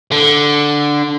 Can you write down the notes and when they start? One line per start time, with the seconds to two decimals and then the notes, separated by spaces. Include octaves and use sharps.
0.12 D3